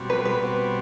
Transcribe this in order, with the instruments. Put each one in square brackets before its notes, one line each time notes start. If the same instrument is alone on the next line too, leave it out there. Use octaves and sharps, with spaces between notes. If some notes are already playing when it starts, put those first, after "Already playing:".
Already playing: [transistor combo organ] B2 G3 C4 F#4
[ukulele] B4
B4
[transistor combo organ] B2 G3 C4 F#4